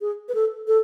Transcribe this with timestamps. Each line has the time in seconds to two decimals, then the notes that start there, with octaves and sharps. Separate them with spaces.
0.01 G#4
0.29 B4
0.35 A4
0.68 A4